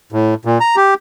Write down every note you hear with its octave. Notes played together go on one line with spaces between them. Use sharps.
A2
A#2
A#5
G4